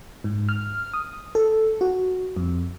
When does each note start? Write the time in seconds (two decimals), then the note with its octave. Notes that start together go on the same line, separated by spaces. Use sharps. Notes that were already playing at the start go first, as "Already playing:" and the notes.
0.24 G#2
0.49 F6
0.94 D#6
1.35 A4
1.81 F#4
2.37 F2